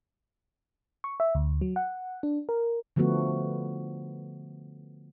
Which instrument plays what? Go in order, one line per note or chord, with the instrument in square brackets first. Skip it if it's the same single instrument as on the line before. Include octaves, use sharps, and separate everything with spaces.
[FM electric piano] C#6
E5
D2
F#3
F#5
D4
A#4
[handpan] D3 F3 A3 B3 F#4